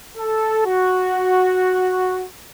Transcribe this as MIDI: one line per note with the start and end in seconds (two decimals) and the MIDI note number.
0.17 0.61 69
0.66 2.25 66